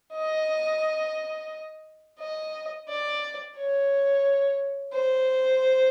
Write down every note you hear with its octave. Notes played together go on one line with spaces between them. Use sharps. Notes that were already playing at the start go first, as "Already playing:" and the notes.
D#5
D#5
D5
C#5
C5